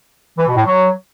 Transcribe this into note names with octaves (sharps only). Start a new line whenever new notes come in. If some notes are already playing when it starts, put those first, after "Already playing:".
E3
B2
A2
F#3